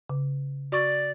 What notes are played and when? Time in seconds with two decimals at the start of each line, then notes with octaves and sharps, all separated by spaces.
0.10 C#3
0.72 F#4 D5 C#6